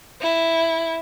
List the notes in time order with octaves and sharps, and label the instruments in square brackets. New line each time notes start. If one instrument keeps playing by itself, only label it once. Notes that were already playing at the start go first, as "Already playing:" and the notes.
[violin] E4